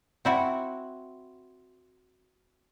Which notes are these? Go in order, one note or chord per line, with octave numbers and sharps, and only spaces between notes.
C4 E4 F#4